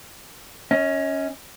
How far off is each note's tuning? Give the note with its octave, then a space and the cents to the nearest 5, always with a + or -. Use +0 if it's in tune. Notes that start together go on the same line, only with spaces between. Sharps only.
C#4 +0 D#5 +40